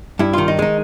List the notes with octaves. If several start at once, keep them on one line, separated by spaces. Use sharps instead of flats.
G2 E4
D#3 F4
D#4
G#3 D#4